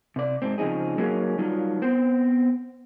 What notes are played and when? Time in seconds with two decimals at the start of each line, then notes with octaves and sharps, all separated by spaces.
0.16 C3 D5
0.42 G#2 C4
0.58 C#3 F3 C4 D#4 G#4
0.98 F#3 A#3 C#4 D#4 F#4 G#4
1.38 F#3 G3 D#4 F4
1.82 B3 C4 C5